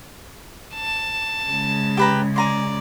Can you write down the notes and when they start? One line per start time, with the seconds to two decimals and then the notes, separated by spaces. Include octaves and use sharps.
0.75 A5
1.48 C#3 G#3
1.97 G4 B4 A#5
2.36 D5 G#5 A#5 C6